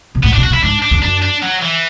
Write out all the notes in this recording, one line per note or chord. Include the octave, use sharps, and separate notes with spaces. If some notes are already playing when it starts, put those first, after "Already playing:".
B2
A2 B3
D4
B2
F#4
B2
E4
G#2 D4
D4
E2
F#2 D4
D4
F#3
E3